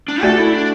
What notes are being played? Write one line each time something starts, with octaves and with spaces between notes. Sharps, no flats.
D4
A3 F#4 A4 D5
E4
D4